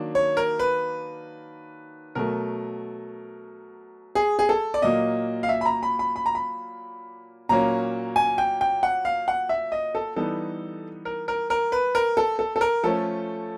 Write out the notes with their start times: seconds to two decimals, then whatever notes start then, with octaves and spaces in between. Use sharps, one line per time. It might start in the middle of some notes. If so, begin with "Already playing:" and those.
Already playing: D#3 F#3 A#3 D4
0.15 C#5
0.37 A#4
0.59 B4
2.15 B2 F#3 A3 A#4
4.15 G#4
4.39 G#4
4.49 A4
4.74 D5
4.82 A#2 F#3 A#3 D#5
5.43 F5
5.49 E5
5.61 B5
5.66 A#5
5.83 B5
5.99 B5
6.16 B5
6.26 A#5
6.35 B5
7.49 A#2 F#3 A#3 C#4 A#5
8.16 G#5
8.38 G5
8.61 G5
8.83 F#5
9.05 F5
9.28 F#5
9.49 E5
9.72 D#5
9.95 A4
10.16 E3 G3 B3 D#4 A4
11.05 A#4
11.28 A#4
11.50 A#4
11.72 B4
11.95 A#4
12.17 A4
12.39 A4
12.56 A4
12.61 A#4
12.83 F3 A3 C#4 A4